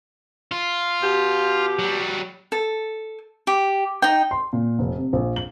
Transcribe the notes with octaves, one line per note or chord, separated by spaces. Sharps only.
F4
B2 G4
F#3 G3
A4
G4
D#4 G5
C6
A#2
F1
C3
A#1
F#7